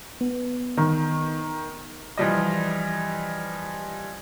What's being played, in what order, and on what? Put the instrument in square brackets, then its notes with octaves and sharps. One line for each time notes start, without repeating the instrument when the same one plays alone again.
[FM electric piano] B3
[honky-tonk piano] D#3
[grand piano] E3 F3 G3 D#5